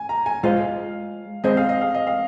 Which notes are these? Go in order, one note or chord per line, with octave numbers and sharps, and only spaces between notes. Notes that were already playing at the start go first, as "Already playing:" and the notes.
Already playing: G#5
A#5
G#5
G#3 F4 C5 D#5 F5
G#3 C4 G#4 C5 D#5
F5
D#5
F5
D#5
F5